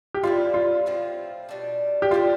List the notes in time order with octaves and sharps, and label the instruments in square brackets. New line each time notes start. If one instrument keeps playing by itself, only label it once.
[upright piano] G4
[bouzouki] G3 C4 E4 [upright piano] F4
[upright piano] F4
[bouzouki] A2 F3 C4 F4
B2 G3 D4
[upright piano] G4
[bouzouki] C3 G3 D4 A4 [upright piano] F4